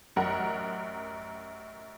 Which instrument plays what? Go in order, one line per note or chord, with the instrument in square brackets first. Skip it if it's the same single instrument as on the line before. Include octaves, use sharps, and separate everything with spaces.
[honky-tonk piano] A1 F#2 A#4 F#5